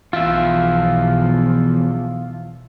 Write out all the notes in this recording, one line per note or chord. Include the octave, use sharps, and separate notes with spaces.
B1 E2 F3 F4 E5